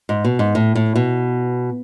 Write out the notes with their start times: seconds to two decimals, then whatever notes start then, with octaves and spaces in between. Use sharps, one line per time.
0.09 G#2
0.24 B2
0.39 G#2
0.55 A2
0.75 A2
0.96 B2